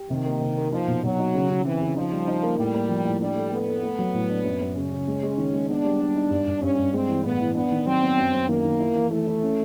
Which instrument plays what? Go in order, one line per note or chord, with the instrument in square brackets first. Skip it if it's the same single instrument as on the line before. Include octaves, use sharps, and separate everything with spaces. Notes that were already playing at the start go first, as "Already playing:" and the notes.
Already playing: [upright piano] G4
[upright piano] C3 [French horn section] D#3
[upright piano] A#3
C3
A#3
[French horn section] F3 [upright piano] D#4
[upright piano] B2
[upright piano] B2 [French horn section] F#3
[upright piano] D#4
C#3
C#3
[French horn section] E3 [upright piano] C4
[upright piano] C#3
[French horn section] F3 [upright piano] D#4
[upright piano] G3
D#4
A#3
[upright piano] A2 [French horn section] G3
[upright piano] A#3
F3
A2
[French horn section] G3 [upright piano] D4
[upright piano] A3
[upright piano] A3 [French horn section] B3
[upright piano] A3
A3
F#3
A2
D4
F#2
F#2
[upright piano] C#3 [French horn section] C#4
[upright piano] C#3
G#3
G#3
D#3
G#3
[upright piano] B3 [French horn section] D4
[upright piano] G3
G3
D#4
G2
G2
[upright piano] G2 [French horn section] C#4
[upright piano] G2
[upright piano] G#3 [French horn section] C4
[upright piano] E3
[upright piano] A2 [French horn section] B3
[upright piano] E3
[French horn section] B3 [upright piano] D4
[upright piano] D#3
[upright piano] F#3 [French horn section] C4
[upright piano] B3
F#2
F#2
[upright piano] D#3 [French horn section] A#3
[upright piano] D#3
E4
E3
[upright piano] E3 [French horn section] A3
[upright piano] E4
C#4